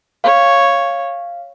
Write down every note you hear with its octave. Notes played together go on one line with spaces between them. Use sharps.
C#5 F5